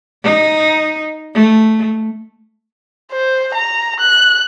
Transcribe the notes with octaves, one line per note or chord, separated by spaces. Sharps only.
D#4
A3
C5
A#5
F#6